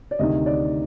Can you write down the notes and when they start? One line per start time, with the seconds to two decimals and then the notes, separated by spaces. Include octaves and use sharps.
0.11 D5
0.19 D2 C3 D#3 D#5
0.46 D5